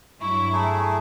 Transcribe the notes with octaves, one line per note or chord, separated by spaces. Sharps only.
G2 F#3 E4 C#6
A3 G#4 A#5